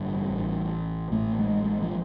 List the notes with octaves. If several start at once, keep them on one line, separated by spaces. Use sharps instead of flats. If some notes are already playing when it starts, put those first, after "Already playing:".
Already playing: A1 G2 D3 G3
A1 A2
A1 A2 A3
G#3
G#3
F3